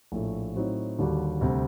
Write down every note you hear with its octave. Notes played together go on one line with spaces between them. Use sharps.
A#1 A2 A3
A2 F#3 C4 D#4 F#4
D#2 D3 G3 D4 F#4
D2 C3 G3